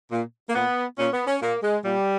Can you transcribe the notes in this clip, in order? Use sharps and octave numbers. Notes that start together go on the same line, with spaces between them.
A#2
A#3
A#2 B3
A#2 C#4
B3
C#4
A#2 A#3
G#3
A#2 G3